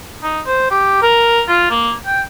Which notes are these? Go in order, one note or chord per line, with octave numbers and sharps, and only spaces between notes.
D#4
C5
G4
A#4
F4
A#3
G5